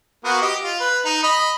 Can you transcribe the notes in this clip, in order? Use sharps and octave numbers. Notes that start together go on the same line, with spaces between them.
A#3 B3 F#4
G4 D#5
F4
B4
D#4
D#5 B5